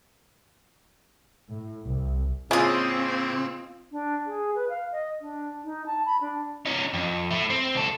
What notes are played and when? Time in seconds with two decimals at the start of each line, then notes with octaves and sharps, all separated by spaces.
1.51 A2
1.86 C2
2.51 A2 C#3 G#3 A#3 C4 C#4 F4 D#5
3.92 D4
4.27 G#4
4.55 B4
4.69 F5
4.92 D#5
5.21 D4
5.64 D#4
5.86 A5
6.06 B5
6.21 D4
6.66 C#4 D#4
6.94 F2
7.31 A3 E4
7.50 C4
7.75 C#2 A4